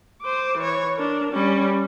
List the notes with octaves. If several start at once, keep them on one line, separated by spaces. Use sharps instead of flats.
C5 D6
E3 C#5
D4 A#4
G3 C#4